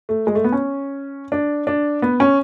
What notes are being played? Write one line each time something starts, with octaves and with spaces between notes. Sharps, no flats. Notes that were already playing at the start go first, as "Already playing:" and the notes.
A3
G#3
A3
B3
C#4
D4
D4
B3
C#4